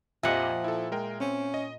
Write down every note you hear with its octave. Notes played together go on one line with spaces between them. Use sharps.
F2 A#2 F3 G4 D#5 E5 F#5
E4 A4
G#3 A#4 G5
C4 C#4
D#5